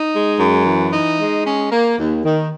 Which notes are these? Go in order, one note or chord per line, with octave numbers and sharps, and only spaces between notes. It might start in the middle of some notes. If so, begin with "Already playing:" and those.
Already playing: D#4
G#3
F#2
E3
D#4
G#3
C#4
A#3
D#2
D#3